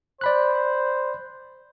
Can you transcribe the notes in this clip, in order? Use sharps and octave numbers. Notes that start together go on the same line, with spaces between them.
C5 D5 B5 F#6